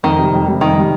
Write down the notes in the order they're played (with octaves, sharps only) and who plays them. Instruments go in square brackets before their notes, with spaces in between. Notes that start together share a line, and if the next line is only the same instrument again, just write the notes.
[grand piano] F2 [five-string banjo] D#3
[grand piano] C3 G3
F2
C3 G3
[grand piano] F2 [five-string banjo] D#3
[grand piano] C3 G3